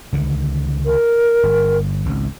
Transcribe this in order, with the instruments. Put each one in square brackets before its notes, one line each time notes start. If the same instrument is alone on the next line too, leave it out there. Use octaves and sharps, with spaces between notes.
[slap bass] C#2 D3 D#3
[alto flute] A#4
[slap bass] G1
G#1 C#2